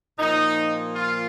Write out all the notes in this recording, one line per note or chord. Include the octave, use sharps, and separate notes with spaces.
A#2 F3 D#4
F4